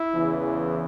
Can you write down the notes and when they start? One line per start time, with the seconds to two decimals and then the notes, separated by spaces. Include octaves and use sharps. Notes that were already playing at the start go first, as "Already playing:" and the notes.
Already playing: E4
0.14 E2 C#3 E3